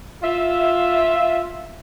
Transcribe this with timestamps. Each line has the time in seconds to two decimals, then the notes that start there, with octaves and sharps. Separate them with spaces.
0.23 F4 E5